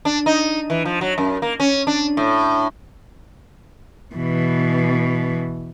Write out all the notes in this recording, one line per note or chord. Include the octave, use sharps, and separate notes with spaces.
D4
D#4
E3
F3
F#3
F#2
A#3
C#4
D4
A2
B2 E3